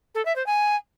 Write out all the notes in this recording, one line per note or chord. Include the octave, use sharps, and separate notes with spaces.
A4
E5
C5
G#5